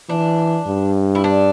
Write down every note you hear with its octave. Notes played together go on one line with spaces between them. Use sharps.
E3 D4
G2
E4
D4